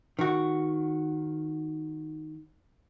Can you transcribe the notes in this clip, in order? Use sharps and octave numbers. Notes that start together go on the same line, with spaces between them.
D#3 F#4